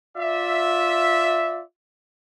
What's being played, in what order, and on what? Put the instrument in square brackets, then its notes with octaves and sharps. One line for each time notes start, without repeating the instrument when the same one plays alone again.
[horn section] F4 D5 E5